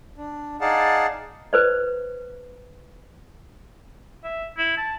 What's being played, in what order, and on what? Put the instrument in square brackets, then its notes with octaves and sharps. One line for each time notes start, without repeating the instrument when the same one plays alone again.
[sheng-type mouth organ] D4
D#4 G#4 D5 F5 F#5 A5
[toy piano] B4 C5 D5
[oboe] E5
E4
A5